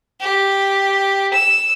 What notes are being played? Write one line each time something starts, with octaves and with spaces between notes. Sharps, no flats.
G4
E6